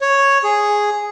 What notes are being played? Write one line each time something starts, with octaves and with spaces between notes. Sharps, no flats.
C#5
G#4